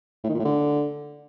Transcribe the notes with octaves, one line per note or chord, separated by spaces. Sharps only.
A2
D#3
A#2
A2
D3